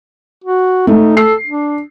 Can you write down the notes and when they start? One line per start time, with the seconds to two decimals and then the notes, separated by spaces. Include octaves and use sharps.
0.44 F#4
0.87 A3 D#4
1.17 A4 C7
1.46 D4